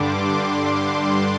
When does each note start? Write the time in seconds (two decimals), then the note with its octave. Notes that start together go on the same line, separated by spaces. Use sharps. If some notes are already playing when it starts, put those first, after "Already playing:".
Already playing: G2 D3 G3 D4 C6 D6
0.38 C6
0.93 D6